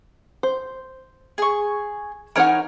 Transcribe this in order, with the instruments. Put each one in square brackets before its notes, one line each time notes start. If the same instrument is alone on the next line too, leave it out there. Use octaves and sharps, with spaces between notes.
[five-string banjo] C5
[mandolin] G#4 C#6
[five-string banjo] E3 D#4 F#5 [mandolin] A#4 C#5 F6